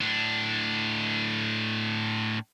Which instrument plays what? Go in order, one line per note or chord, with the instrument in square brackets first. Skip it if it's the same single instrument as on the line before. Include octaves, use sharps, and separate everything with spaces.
[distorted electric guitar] A2 D4